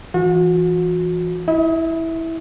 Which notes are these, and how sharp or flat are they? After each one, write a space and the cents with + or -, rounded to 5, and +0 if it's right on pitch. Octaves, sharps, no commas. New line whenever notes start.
E3 +20 F#4 -40
E4 -10 D#5 +35